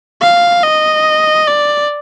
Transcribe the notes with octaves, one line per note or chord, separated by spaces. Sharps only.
F5
D#5
D5